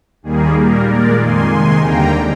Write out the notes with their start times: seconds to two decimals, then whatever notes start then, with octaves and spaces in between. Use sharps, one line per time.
0.23 D#2 D#3 G3 A#3 G#4
0.55 A#2 G3 A#3 A#4
0.86 A#2 G#3 A#4 D5
1.18 F2 D#3 A#3 G#5 C6
1.49 C3 D#3 G#3 G#5 C6
1.82 D#2 D3 G3 A#3 G5 A#5